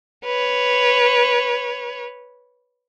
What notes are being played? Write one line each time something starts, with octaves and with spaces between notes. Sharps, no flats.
B4 C#5